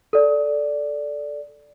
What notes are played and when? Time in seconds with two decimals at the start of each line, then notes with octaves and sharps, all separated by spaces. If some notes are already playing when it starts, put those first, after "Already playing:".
0.13 A4 D5